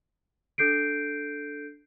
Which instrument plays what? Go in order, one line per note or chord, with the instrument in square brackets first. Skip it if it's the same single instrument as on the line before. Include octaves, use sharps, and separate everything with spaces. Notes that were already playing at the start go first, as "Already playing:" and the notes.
[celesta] D4 A4 G6 C7 D7